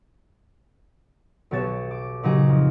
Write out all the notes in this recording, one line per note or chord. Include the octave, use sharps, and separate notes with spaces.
B1 B2 G4 C#5 A6 E7
D6
A#2 C#3 F#3 D#4 G4 G#4
F2